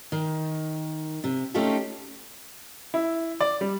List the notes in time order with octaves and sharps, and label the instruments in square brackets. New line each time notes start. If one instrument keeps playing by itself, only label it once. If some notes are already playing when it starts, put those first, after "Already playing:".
[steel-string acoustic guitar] D#3
C3
A3 C#4 D#4 F4 G4 A4
[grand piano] E4
D5
G3